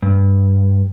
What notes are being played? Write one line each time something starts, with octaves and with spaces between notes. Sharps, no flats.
G2